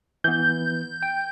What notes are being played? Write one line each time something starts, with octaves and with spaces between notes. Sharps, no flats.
E3 B3 G6
G5